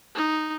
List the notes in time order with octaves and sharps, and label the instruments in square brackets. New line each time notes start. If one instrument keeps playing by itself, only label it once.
[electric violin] D#4